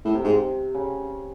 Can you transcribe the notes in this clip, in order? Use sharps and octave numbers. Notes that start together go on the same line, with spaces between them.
A2
C3
G#2
C#3